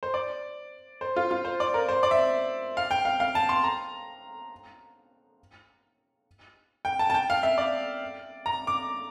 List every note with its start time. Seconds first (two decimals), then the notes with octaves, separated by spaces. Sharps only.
0.03 C5
0.14 D5
1.01 C5
1.16 F4
1.31 F4
1.45 C5
1.60 D5
1.74 A#4
1.89 C5
2.03 D5
2.11 E5
2.77 F5
2.91 G5
3.05 F5
3.20 F5
3.35 A5
3.49 C6
3.64 A#5
6.85 G5
6.99 A5
7.10 A5
7.14 G5
7.30 F5
7.43 E5
7.58 D5
8.46 A#5
8.67 D6